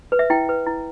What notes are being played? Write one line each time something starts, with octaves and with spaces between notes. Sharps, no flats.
B4
E5
E4 G5
B4
E4